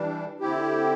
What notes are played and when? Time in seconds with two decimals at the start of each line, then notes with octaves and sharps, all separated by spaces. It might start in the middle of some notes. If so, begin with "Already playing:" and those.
Already playing: E3 G3 D4
0.40 D3 C4 E4 G4